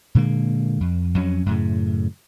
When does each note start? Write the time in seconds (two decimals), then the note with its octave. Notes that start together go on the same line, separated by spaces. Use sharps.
0.15 A#2 D3 G#3 A#3
0.81 F2
1.15 F2 F#3 C#4
1.46 F#2 A2 C#3